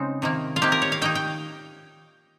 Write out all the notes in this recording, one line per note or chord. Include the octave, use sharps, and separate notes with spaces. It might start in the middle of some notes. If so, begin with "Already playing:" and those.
Already playing: C#3 G#3 C4 D#4
C3 D#3 A#3
F4
C3 D#3 A#3 G4
A#4
C#5
F5
D#3 A#3 D#4 G5
G5